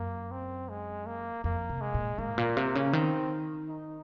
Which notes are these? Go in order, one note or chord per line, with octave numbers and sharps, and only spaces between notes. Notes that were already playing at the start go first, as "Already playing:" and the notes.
Already playing: F#2 A#3
C4
G#3
A#3
F2 A#3
C3
G#3
A#2
G#2 A#3
A#2
C3
C#3
D#3 C4
D#4